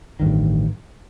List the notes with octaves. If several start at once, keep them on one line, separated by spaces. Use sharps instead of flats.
A1 G2 D#3